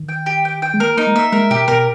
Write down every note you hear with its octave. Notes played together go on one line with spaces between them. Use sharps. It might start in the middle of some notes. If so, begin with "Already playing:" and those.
Already playing: D#3
G5
G4
G5
G5
G#3
A#3 A#4
A#3 D#4
G#3
A#3 E5
G#3 A#4
B2 G4
B2 A#4